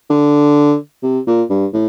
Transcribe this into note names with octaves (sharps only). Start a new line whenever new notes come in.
D3
C3
A#2
G2
A2